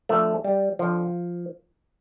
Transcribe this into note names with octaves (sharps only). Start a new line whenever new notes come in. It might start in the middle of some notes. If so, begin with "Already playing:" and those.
F2 D3 F3 A3
G3
F2 D3 F3